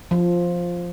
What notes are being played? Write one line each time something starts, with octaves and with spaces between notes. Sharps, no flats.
F3